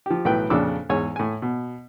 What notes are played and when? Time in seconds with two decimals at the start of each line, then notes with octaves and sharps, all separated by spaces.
0.06 F3 G4
0.25 B1 A2 E3 B4 G5
0.50 F2 A#2 C#3 D4 D6 E6
0.89 E2 G#2 C#5 G#5
1.16 A2 G#5
1.42 B2